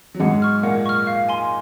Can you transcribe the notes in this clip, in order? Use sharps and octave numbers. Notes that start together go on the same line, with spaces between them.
F#3
G#2 G#3 F#5
C#6 F6
A#2 A#3 F#5
C#6 F6
F5
G#5 C6